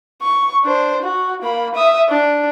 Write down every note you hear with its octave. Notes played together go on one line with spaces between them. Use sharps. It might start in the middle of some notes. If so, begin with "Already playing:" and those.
C#6
D4 C5
F#4
A#3 B5
E5 D#6
D4